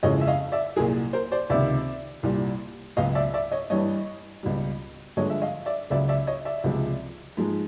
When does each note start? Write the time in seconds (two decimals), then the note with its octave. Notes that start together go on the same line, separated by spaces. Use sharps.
0.03 F2 C#3 E3 G#3 C#5 D#5
0.21 E5
0.27 D#5 F5
0.52 D5 E5
0.76 C2 A#2 F#3 G#4 A#4
1.13 A#4 C5
1.32 C5 D5
1.50 C#2 C3 D#3 D5 E5
2.23 C2 A#2 G3
2.96 C#2 B2 F#3 D#5 F5
3.15 D5 E5
3.34 D5 E5
3.52 C#5 D#5
3.70 G2 E3 G3 C#5 D#5
4.43 C#2 B2 G3
5.17 G2 D3 F3 G#3 C#5 D#5
5.29 E5
5.42 D#5 F5
5.66 D5 E5
5.90 C#2 C#3 F#3 D5 E5
6.08 D5 E5
6.27 C#5 D#5
6.45 D5 E5
6.64 C#2 C3 F3 G#3
7.37 G#2 F3 G#3